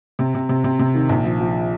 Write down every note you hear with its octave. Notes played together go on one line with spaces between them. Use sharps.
C3
C3
C3
C3
C3
D#3
A#1
F3
F3